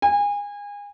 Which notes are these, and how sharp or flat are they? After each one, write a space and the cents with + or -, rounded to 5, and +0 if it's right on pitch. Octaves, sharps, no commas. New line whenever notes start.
G#5 -30